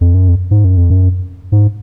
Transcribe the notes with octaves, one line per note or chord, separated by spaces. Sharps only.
F2
F#2
F2
G#2
F#2
F2
F#2
G#2